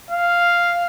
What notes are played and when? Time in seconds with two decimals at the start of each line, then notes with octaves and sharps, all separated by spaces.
0.11 F5